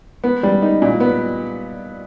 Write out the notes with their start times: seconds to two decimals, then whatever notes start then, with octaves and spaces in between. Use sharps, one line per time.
0.24 B3
0.43 G3
0.62 D#4
0.82 A#2
1.00 B3